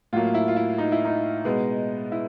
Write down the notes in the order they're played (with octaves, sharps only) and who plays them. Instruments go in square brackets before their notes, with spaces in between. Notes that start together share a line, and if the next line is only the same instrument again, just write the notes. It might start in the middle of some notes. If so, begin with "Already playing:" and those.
[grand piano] A2 F#3 A#3 F4
E4
F4
E4
D#4
E4
D#4
B2 G#3 B3
E4